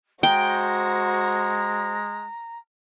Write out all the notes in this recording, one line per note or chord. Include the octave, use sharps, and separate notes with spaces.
G#3 F#4 C5 G5 A#5